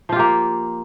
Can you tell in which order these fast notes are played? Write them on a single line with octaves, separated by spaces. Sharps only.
F3 F4 G4 A#3